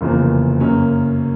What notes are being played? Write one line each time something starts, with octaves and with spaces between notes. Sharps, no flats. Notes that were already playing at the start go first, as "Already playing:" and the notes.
F1 E2 C#3 F3 A#3
F#2 C#3 F#3 A#3 C#4